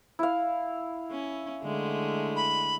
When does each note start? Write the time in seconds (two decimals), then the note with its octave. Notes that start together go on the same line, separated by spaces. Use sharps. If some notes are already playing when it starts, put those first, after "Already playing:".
0.19 E4 F5
1.11 C#4
1.62 D3 G#3 A3
2.36 B5